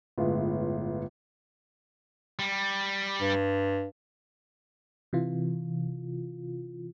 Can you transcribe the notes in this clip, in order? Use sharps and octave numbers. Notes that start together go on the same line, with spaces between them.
G1 A2 G#3 F4 B4
G3
G2
C3 E3 F4